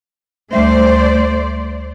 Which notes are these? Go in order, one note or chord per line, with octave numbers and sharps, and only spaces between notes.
D2 G3 A3 C5 D5 E5